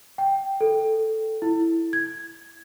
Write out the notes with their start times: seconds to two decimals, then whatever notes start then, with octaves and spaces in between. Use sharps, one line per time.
0.18 G5
0.61 A4
1.42 E4
1.93 G#6